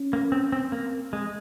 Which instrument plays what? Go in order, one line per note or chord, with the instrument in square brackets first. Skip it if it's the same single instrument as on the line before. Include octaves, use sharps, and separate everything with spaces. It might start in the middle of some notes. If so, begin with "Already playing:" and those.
Already playing: [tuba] C#4
[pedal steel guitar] A#3
C4
C4
[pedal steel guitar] A#3 [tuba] C4
[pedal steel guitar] G#3